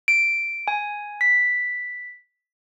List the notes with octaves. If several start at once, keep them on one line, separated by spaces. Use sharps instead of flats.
D7
G#5
B6